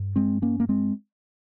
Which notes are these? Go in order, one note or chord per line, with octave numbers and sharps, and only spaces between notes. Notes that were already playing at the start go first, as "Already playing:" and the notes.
Already playing: G2
G#3 C4
A#3 C#4
A#3
G#3 C4